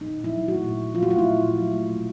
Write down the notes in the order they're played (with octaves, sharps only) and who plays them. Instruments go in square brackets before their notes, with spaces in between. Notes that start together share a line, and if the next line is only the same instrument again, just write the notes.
[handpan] A#2 D#4
A#2
E4
F#3
A3 F#4
A#2
A#2
F#3 F4
F#4
A3 F4
E4
A#2
A#2
F#3
A3
B2